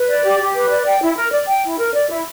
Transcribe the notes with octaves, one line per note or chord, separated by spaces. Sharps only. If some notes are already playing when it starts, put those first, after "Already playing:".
Already playing: B4
D5
G4
G4
B4
D5
G5
E4
A#4
D5
G5
E4
A#4
D5
E4